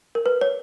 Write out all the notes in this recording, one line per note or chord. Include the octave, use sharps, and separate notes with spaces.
A#4
B4
C#5